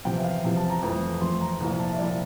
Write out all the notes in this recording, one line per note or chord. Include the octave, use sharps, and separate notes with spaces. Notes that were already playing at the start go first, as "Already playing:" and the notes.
E2 C3 F3 G5
E5
F5
E2 C3 F3 G5
A5
A#5
F2 E3 A3
F2 E3 A3 C6
A#5
C2 A#2 F3 A#5
A5
E5
C2 A#2 F3 D5